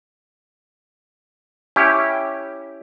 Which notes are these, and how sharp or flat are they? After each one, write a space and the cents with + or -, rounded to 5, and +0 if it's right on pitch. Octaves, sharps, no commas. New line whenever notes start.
C#4 +0 E4 +0 G4 +0